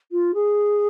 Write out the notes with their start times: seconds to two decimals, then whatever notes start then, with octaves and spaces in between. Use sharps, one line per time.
0.11 F4
0.34 G#4